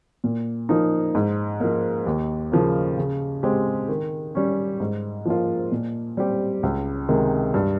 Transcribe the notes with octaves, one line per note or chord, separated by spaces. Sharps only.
A#2
F3 A#3 D#4
G#2
F3 A#3
D#2
C#3 F3 A#3
C#3
G#3 C4 G4
D#3
G3 C#4
G#2
F3 A#3 F4
A#2
G3 C4 G4
C#2
C3 D#3 G#3
G2